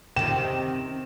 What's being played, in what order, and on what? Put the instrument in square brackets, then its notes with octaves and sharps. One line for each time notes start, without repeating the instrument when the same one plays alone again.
[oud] C3 D#3 [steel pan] G5 [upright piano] E7